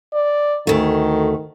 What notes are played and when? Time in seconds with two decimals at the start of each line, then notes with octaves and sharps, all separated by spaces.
0.13 D5
0.67 D2 D#3 A3